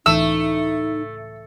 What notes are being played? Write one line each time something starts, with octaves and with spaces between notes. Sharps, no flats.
C#2 A2 E3 A3 D#4 E6